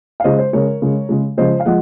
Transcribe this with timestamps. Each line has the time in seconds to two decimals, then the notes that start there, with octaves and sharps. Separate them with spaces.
0.20 F5
0.24 C#3 G#3 C5 D#5
0.39 C5
0.53 C#3 G#3 A#4 C#5
0.82 C#3 G#3
1.09 C#3 G#3
1.37 C#3 F3 G#3 C5 D#5
1.60 F5
1.65 F3 G#3 D#5 F#5